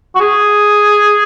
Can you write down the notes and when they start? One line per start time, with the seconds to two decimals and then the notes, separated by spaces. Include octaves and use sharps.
0.15 F#4
0.21 G#4